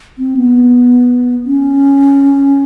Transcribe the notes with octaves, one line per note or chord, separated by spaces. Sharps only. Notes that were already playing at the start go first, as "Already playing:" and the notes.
C4
B3
C#4